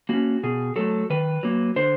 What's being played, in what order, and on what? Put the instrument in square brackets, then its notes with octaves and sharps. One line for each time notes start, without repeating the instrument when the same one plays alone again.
[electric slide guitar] A#3 C#4 F#4
B2 G#4
F#3 A3 A4
D#3 B4
F#3 A#3
D3 C5